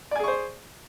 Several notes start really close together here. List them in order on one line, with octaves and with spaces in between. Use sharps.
D5 G#5 G#4 C#6 C5